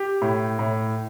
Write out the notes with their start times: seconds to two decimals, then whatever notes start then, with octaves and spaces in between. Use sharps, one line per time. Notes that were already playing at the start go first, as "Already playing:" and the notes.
Already playing: G4
0.22 A2
0.59 A2